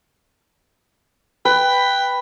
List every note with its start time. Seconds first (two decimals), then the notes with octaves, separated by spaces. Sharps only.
1.45 B4 G5